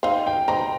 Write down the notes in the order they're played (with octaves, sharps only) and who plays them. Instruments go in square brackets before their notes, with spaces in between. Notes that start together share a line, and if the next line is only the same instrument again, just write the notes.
[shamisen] C4 D#4 [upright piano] F5
[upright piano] G5
[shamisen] C4 D#4 [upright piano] A#5